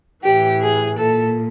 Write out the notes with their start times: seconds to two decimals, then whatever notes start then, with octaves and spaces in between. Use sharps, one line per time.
0.24 A2 E3 G4
0.62 G#4
0.98 A#2 A4